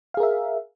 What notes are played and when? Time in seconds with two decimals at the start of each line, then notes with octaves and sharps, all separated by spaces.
0.14 F5
0.17 G#4
0.20 A#4
0.23 E5